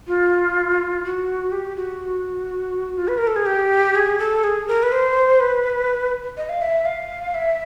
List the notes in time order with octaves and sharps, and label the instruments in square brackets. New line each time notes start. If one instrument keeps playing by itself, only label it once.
[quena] F4
F#4
G4
F#4
F4
B4
A#4
A4
G#4
G4
G#4
A4
G#4
A#4
B4
C5
B4
D#5
F5
E5
F5
E5